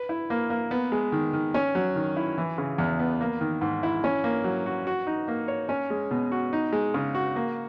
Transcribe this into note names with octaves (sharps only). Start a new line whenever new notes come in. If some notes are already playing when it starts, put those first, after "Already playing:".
Already playing: B4
E4
A#3
A#3
B3
G#3
D#3
D#3
C#4
F#3
D#3
E4
E3
C#3
E2
B3
A#3
D#3
G#2
E4
C#4
A#3
F#3
F#4
F#4
D#4
A#3
C#5
C#4
G#3
B2
F#4
D#4
G#3
C#3
F#4
A#3